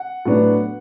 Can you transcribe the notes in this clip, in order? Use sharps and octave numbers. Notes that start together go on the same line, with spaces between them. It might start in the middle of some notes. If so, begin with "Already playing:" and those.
Already playing: F#5
A2 F#3 B3 D4